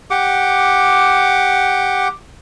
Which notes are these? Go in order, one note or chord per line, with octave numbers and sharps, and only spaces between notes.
G4 F#5 D6